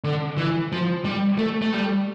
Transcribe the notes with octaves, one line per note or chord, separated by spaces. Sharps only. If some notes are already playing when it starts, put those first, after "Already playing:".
D3
E3
F3
G3
A3
A3
G3